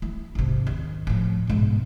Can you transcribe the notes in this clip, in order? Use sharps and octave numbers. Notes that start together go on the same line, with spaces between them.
A3 E4
G#1 C3
D#2
A2 F3
G#2 B2